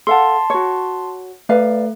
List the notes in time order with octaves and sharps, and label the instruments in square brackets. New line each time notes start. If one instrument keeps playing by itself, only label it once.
[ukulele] A4 F5 F#5 [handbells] A5 C6
[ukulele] F#4 C#5
[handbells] A3 [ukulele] B4 D5 F5